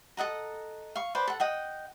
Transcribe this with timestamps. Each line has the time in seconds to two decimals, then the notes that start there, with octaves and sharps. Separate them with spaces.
0.17 A4 D#5 F#5 A#5
0.96 F5 C#6
1.15 B4 C5 D5 A5
1.27 A4 F#5
1.40 D#5 F#5 G5